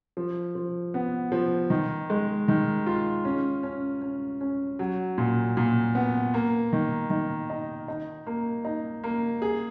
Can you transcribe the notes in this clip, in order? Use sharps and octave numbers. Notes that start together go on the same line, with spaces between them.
F3
F3
B3
F3
D#3
G#3
D#3
F4
C#4
C#4
C#4
C#4
F#3
A#2
A#2
B3
A#3
D#3
D#3
D#4
D#4
A#3
D#4
A#3
G#4